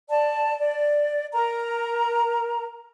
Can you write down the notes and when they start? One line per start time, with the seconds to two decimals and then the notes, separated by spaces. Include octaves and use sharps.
0.09 D5 A5
0.58 D5
1.33 A#4 A#5